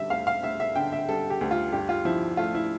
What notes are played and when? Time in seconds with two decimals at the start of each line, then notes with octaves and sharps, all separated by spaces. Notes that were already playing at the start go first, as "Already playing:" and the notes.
Already playing: D3 G3 E5
0.10 D2 F5
0.27 F5
0.43 D2 E5
0.60 E5
0.75 D3 G5
0.92 E5
1.09 G3 A4
1.30 G4
1.41 D2
1.51 F4
1.72 G2 G4
1.89 F4
2.05 F3 E4
2.37 A3 F4
2.55 E4